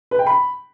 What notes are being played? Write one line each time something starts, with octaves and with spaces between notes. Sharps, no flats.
B4
G5
B5